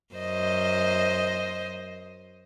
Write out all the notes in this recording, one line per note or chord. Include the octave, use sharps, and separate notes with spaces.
F#2 C5 D#5